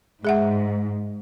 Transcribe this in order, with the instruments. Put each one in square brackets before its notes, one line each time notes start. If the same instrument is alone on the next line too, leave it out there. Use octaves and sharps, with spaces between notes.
[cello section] G#2 [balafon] G#4 E5 F#5